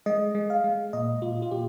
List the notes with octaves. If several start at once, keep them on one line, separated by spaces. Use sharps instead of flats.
G#3 D#5
G#3
F5
G#3
A#2 D#5
A#2 F4
F4
A#2 G4